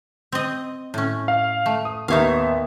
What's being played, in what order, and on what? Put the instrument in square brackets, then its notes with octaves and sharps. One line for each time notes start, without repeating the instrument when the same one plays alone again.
[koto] C4 D#5
A2 C#4
[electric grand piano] F5
[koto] A3
[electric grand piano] D#6
[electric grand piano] D#2 B3 E5 [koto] D#4 C#5 F5